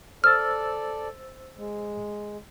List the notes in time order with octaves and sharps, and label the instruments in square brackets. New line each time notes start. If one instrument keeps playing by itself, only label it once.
[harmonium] A4 D5 [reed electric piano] C5 E6 A6 [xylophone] F6
[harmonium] G#3